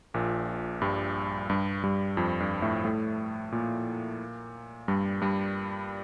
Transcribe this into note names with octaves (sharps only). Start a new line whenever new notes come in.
A#1 A#2
G2 G3
G2 G3
G2 G3
F2 F3
G2 G3
A2 A3
A2 A3
A#2 A#3
G2 G3
G2 G3